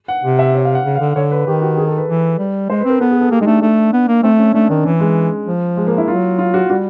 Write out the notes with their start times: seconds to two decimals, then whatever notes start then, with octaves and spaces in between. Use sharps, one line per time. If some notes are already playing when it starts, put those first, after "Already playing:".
0.08 F#5
0.24 C3
0.39 E5
0.55 C#5
0.65 F5
0.75 F#5
0.85 C#3
0.95 F5
1.00 D3
1.16 D3 C#5
1.31 B4
1.47 D#3 G4
1.62 F#4
1.77 G#4
1.87 A4
1.98 B4
2.08 E3
2.39 G3
2.69 G#3 C5
2.80 B4
2.85 C4 A#4
3.01 B3 A4
3.11 G#4
3.21 A4
3.31 A#3 G4
3.41 G#3 D#4
3.46 A3 D4
3.62 A3
3.93 B3
4.08 A#3
4.23 A3 C4
4.39 C#4
4.54 A3 D4
4.69 D#3 D4
4.85 E3 C#4
5.00 G#3
5.46 F3
5.77 G#3
5.87 A#3
5.98 E4
6.08 F#3 F4
6.39 F4
6.54 F#4
6.69 G3 F#4